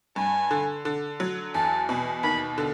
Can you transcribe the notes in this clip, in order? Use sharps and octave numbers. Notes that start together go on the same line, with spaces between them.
G2 G#5
D3
D3
F#3
E2 A5
B2
D#2 B5
D3